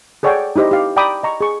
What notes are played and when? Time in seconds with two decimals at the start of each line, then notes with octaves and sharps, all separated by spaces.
0.23 G#4 A4 C#5 D5 F#5 G5
0.56 D#4 E4 G4 C5 D#5
0.71 G4 F5
0.96 D5 G5 A#5 B5 D6 D#6
1.23 D#5 A#5 C#6
1.41 G#4 C#6